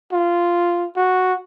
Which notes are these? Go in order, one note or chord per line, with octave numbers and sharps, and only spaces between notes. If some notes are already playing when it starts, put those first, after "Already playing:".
F4
F#4